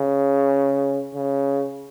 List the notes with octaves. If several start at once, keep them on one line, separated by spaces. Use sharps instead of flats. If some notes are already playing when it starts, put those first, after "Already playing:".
Already playing: C#3
C#3